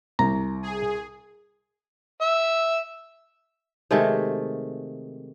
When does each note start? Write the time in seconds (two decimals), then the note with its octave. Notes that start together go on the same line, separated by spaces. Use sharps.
0.19 C2 A#5
0.63 G#4
2.21 E5
3.91 C3 D#3 G#3 A3